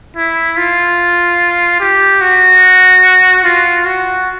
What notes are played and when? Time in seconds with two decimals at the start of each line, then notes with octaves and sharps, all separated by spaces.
0.17 E4
0.57 F4
1.80 G4
2.21 F#4
3.44 F4
3.85 F#4